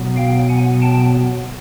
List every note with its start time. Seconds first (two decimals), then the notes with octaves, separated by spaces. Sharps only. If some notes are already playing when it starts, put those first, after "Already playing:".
Already playing: B2 F#3 B3
0.16 F5 G5
0.49 F#5 G#5
0.81 G5 A5